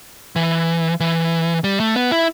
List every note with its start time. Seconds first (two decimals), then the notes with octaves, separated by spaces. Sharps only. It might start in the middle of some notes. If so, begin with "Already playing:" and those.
0.36 E3
1.00 E3
1.64 G3
1.80 A3
1.96 B3
2.11 E4